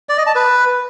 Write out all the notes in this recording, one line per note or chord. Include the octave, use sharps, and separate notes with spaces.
D5
D#5
A5
B4